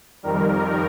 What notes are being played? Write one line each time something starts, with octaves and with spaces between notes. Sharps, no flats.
F2 D#3 G3 A#4